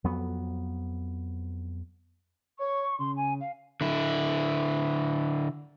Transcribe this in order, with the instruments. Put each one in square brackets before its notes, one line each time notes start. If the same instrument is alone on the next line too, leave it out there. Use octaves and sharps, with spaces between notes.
[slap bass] F2 F#3 B3
[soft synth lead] C#5 [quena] C#6
[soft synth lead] C#3 [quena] C6
[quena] G#5
F5
[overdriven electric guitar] D3 E4